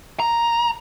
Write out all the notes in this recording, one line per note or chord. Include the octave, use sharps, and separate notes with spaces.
A#5